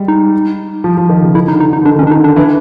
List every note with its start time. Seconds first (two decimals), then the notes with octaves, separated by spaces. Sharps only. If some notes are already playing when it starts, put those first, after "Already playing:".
Already playing: G3 G#3
0.08 D#4
0.84 F3
0.97 F3
1.09 D#3
1.22 C#3
1.35 D#3 E4
1.48 D#4
1.52 D3
1.60 D#4
1.69 D3
1.73 D#4
1.81 D3
1.85 D#3 D4
1.99 C#4
2.03 D#3
2.07 D4
2.11 D#4
2.20 D3
2.24 D4
2.36 E3